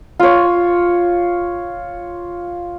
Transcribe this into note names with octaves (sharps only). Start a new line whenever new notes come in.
F4 C#5